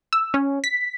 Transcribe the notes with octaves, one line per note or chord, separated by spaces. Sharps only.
E6
C#4
B6